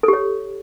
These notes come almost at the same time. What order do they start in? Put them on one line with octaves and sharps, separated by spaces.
A4 G4 C#5